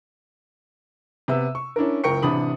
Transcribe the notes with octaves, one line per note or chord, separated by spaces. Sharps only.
C3 B3 E5 E6
C#6
C#4 D4 E4 A#4
F#1 C#2 A#4 G5 C#6 C#7
A1 C3 D4 B5 D#6 F#7